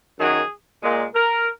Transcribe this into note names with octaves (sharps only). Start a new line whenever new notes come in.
F#2 D#3 F#3 G#4
A#2 G#3
A#4